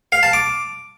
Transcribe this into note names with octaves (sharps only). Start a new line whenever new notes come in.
F5
A5
D6